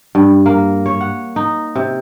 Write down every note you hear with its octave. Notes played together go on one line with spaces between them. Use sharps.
G2
A#3
C#5
F#5
D#4
C3